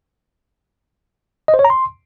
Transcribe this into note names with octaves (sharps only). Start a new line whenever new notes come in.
D#5
C5
C#5
A#5
C6